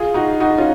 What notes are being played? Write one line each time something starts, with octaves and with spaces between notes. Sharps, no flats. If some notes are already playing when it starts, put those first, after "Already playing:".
Already playing: F4 G#4
D#4 F#4
D#4 F#4
C#4 F4